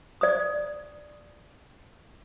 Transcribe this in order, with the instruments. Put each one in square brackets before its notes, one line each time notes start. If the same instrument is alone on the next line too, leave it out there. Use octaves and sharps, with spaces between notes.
[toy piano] D5 D#6